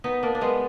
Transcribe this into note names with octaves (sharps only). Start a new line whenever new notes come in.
B3 D#4
A#3 D4
D4
G#3 B3